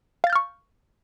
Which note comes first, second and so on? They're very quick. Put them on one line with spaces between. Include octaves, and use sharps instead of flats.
F5 A6 G6 F6 C#6